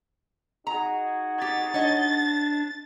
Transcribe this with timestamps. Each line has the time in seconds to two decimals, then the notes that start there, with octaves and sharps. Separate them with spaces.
0.67 D#4 F#4 G#4 A#5
1.41 G4 A6
1.74 D4 C#5 D#5